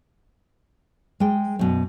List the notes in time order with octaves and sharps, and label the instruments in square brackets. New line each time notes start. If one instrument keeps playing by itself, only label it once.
[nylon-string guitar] G#3 G5
F#2 B2